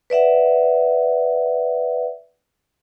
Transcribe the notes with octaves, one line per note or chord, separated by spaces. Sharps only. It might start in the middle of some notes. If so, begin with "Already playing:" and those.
B4 D5 E5 F#5